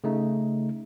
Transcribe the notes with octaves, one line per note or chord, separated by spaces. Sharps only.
C#3 A3 D#4